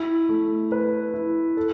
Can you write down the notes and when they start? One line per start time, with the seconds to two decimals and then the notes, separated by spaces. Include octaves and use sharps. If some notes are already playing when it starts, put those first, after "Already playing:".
Already playing: E4
0.29 A3
0.72 B4
1.14 E4
1.57 A4